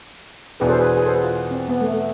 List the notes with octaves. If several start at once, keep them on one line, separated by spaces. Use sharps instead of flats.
E2 B2 B3 D4 G#4 B4
A4 C5
G#4 B4
G#4 B4
A4 C5
G#4 B4
F4
C4
B3
A3
A3